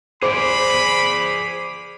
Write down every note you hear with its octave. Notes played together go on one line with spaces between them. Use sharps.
G#4 C5 D5 B5 D6